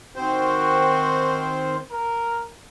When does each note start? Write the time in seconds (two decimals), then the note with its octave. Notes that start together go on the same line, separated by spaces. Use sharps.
0.16 D#3 C4 F#4 C5
1.91 A#4